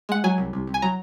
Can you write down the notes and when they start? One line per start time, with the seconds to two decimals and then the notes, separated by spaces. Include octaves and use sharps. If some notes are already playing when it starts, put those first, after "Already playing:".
0.09 G#3 F#5
0.24 F#3 G#5
0.38 C2
0.53 C2
0.67 C2
0.74 G#5
0.82 F#3 A#5